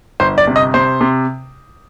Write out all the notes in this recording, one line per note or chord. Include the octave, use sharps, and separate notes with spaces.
G1 C5
D5
C3
D#5
C3 C5
C3